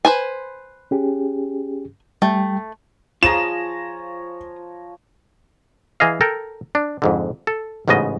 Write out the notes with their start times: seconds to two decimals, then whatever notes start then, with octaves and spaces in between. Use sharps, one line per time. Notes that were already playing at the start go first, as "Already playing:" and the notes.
0.05 B4 C5 G#5
0.91 C#4 G4 G#4
2.22 G3 A3 G5
3.23 F3 F4 G#4 C#5 A#5 E7
6.00 E3 G#4 D#5 F5
6.21 A4 A#4 G5
6.75 D4
7.02 F2 G#2 D3
7.47 A4
7.88 A1 G#2 C#3 B3 D#5